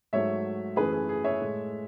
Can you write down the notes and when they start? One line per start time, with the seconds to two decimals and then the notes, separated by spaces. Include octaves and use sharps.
0.13 G#2 F#3 A3 C#5 E5
0.76 F#2 E3 A3 G#4 B4
0.92 G#4
1.09 G#4
1.24 C#5 E5
1.41 A2 G#3